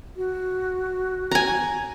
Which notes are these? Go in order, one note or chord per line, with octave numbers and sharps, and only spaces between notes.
F#4
G#5 A#5